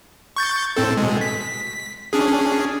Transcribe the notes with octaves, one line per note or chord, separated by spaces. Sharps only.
C#6 G6 A6
A2 C4 A4
B2 G#3
B6
C#4 D4 G#4